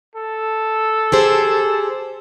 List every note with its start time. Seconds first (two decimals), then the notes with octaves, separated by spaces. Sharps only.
0.16 A4
1.12 G4 G#4 C5